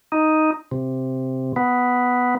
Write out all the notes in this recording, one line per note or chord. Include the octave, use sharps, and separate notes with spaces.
D#4
C3
B3